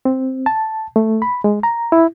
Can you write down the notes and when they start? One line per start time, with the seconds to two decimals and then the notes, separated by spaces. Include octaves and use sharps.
0.05 C4
0.46 A5
0.96 A3
1.22 B5
1.44 G#3
1.63 A#5
1.92 E4